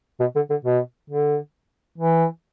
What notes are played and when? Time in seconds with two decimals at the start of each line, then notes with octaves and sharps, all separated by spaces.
0.20 B2
0.36 D3
0.50 D3
0.65 B2
1.10 D3
1.98 E3